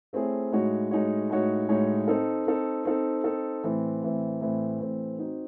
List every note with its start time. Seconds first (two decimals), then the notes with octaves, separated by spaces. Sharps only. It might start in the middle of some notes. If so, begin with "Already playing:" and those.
0.13 A3 C4 E4 G#4 C#5
0.52 A2 G#3 D#4 F#4 C#5
0.91 A2 G#3 D#4 F#4 C#5
1.30 A2 G#3 D#4 F#4 C#5
1.69 A2 G#3 D#4 F#4 C#5
2.08 C4 D#4 A4
2.47 C4 D#4 A4
2.85 C4 D#4 A4
3.24 C4 D#4 A4
3.63 A2 E3 C4
4.02 A2 E3 C4
4.41 A2 E3 C4
4.80 A2 E3 C4
5.19 C4 D#4 F#4